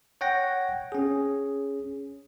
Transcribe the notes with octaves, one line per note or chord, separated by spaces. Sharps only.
C#5 F#5 G5 A#6
C#4 G#4